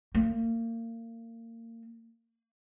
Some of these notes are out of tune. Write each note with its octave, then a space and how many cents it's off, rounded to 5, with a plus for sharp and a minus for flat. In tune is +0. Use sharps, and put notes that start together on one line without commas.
A#3 -30